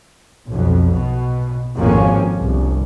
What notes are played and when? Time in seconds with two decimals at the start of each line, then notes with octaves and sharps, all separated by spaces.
0.49 B1 F2
0.92 B2
1.77 G#1 F2 A#3 C4 C#4
2.35 G1 C2